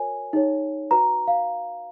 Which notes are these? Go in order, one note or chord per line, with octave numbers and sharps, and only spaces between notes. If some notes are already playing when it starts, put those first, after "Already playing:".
Already playing: F#4 A#4 C#5 G#5
D#4 G#4 C#5
F#4 B4 A#5
F5